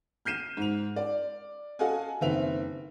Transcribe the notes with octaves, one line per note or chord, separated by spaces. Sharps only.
F6 G6 C7 D#7 E7
G#2 F7
D5
F#4 A4 D#5 F5 F#5 G#5
F#1 D#3 C4 B4 E5 F7